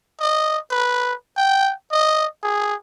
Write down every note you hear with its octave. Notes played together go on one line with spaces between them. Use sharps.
D#5
B4
G5
D#5
G#4